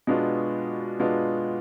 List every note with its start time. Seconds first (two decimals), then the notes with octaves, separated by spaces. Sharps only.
0.07 B2 G#3 B3 D4 F4
0.98 B2 G#3 B3 D4 F4